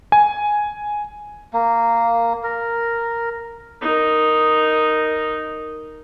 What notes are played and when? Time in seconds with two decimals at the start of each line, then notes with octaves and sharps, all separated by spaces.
0.12 G#5
1.53 A#3
2.44 A#4
3.82 D#4 A#4